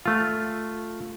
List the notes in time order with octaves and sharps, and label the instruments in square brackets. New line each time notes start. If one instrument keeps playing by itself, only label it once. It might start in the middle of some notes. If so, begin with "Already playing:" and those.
[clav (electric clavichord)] A3 F4